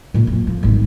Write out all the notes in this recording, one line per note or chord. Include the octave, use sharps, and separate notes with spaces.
A#2 F#3
F2 A#3
F3
G#1 G3